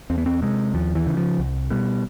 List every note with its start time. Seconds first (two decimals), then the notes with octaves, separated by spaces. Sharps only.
0.10 E2 C4
0.18 B3
0.26 C4
0.42 C3 G#3
0.74 D#2 F3
0.95 E3
1.07 C#3
1.17 F3
1.39 C2
1.70 B2 G3